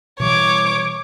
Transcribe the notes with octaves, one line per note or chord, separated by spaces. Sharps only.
B2 E3 G3 C#5 D6